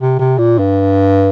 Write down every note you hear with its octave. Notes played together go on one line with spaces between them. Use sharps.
C3
C3
A#2
G2